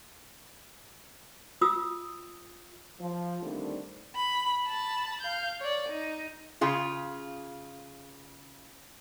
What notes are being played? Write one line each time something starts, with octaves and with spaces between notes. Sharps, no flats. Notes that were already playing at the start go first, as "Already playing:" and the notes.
F4 D#6 E6
F3
D3 D#3 G3 A3 C4
B5
A5 B5
F5 G6
C#5 D5
D#4
C#3 F4 G#4